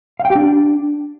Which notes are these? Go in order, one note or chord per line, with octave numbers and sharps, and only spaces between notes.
F5
G5
G4
D4